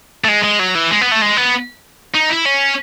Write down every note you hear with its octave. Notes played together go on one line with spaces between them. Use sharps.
A3
G#3
G#3
F#3
E3
G#3
B3
A3
G#3
B3
D#4
E4
C#4